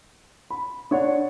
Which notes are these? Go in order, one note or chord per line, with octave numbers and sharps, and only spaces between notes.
B5
D4 C#5 F#5